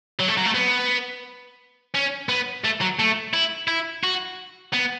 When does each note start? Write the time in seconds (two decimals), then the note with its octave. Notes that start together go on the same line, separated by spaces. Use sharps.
0.20 F#3
0.29 A3
0.38 F#3
0.46 A3
0.55 B3
1.94 C#4
2.29 B3
2.64 A3
2.81 F#3
2.99 A3
3.34 E4
3.68 E4
4.03 F#4
4.73 B3